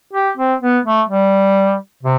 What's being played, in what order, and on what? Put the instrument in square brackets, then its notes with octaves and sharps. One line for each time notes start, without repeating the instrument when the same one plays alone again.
[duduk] G4
C4
B3
A3
G3
C3